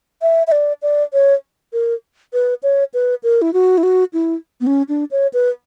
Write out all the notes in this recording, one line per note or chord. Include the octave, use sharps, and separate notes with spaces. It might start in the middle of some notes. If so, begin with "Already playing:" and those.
E5
E5
D5
D5
C#5
A#4
B4
C#5
B4
A#4
E4
F#4
E4
F#4
E4
B3
C#4
D4
C#5
B4